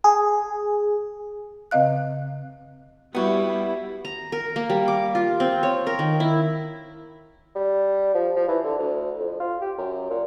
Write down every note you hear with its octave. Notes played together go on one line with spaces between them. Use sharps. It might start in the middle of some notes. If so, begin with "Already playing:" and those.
G#4
C#3 C4 D#5 F5 F#6
G3 B3 E4 F#4
A#5
A#4
A#3
G3
D6
F4
C4
C#5
A#4
D#3
E4
G3
F3
F3
E3
D3
D2
F2
F4
G4
F#2
A#2